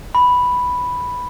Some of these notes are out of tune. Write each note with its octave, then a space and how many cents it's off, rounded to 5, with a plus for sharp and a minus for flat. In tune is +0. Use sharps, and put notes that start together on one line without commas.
B5 +0